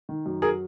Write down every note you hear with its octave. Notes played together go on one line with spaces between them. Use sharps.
D#3
F#2
F#3 G#4 A#4